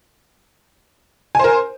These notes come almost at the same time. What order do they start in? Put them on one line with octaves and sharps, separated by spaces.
G#5 C5 A#4